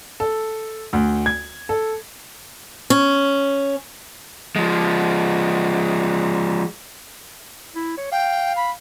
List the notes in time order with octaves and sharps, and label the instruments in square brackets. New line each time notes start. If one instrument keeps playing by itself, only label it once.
[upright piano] A4
D2
G#6
A4
[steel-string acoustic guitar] C#4
[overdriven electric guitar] F3 G#3
[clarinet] E4
C#5
[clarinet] F5 [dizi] G5
[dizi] B5